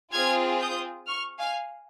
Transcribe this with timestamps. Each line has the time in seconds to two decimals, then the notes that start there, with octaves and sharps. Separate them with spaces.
0.12 C4 F4 G#4 F6 G#6
0.60 D#6 G6
1.07 C#6 F6
1.39 F5 G#5